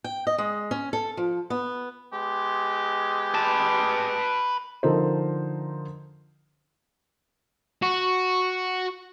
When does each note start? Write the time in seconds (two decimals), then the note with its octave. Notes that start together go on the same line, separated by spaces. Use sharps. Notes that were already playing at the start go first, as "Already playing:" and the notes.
0.04 G5
0.27 D#5
0.38 G#3
0.71 C#4
0.93 A4
1.17 F3
1.50 B3
2.12 G#3 B3 G4
3.34 B4 A5
4.83 D3 F3 D#4 A4 A#4 C5
7.83 F#4